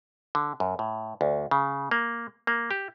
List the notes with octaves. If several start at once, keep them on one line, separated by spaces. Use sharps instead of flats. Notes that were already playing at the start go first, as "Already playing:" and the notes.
D3
F#2
A2
D2
C#3
A#3
A#3
G4